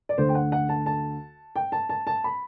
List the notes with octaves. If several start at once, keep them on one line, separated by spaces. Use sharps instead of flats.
D5
D2 D3 A3 C5
G5
F#5
F#5
A5
A5
G5
A5
A5
A5
B5